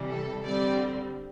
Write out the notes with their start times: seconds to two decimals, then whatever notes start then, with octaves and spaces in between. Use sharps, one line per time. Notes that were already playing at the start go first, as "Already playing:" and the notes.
Already playing: C3 E3 G3
0.10 A4
0.44 D3 G3 C4 D5